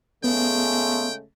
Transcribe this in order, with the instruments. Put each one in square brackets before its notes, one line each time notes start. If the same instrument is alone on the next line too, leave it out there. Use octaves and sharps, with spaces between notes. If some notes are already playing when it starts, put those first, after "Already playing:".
[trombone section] C#3 G#3 A3 [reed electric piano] B3 [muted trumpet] G5